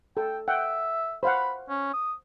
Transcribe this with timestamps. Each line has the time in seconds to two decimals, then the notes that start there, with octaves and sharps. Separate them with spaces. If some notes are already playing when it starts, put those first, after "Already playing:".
0.17 A4 G5
0.48 E5 F#5 G5
1.23 C5 F5 F#5 B5
1.69 C#4
1.93 D#6